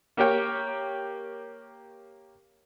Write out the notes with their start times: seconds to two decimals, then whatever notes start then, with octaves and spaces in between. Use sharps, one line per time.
0.17 A#3 G4 A#4 C#5 G5